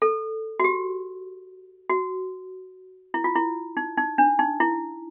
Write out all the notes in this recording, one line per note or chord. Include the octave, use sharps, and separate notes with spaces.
A4
F#4
G4
F#4
E4
F4
E4
D#4
D#4
D4
D#4
E4